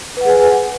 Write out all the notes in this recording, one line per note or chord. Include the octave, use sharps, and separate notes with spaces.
G#4 B4 F#5 G#5